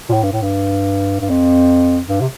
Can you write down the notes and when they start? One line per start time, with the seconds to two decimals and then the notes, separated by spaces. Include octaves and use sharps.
0.09 A#2
0.13 A2
0.23 G2
0.32 A2
0.42 G2
1.21 G2
1.30 F2
2.08 G2
2.21 C3